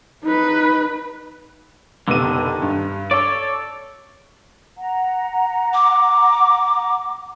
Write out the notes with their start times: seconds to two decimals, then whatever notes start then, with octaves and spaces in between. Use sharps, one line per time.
0.24 D#4 B4
2.08 F1 B2 D3 D#3 D#7
2.62 G2
3.11 A4 C#5 D5
4.77 F#5 A#5
5.74 D6